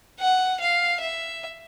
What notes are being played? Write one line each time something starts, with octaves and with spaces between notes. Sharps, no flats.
F#5
F5
E5